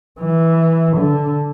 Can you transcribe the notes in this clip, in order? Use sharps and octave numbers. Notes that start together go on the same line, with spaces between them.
E3
D3